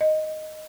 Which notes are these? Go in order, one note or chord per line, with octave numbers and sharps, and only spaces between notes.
D#5